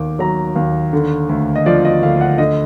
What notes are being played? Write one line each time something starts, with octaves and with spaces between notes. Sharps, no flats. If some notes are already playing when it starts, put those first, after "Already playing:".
Already playing: D#2 D#3 D6
F#3 A#5
D#2
D3
D2
D#5
F3 D5
D#5
D2 F5
F#5
D3 D#5